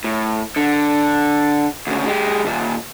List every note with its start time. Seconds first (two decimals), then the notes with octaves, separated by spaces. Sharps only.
0.04 A2
0.56 D3
1.87 D2 C#3
2.06 G#3 G4
2.45 D#2 A#2